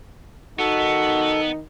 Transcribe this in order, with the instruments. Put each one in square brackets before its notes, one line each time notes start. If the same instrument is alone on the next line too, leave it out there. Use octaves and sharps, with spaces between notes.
[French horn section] D#3 D#4 [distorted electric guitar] B3 [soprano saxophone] F#4 [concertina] A4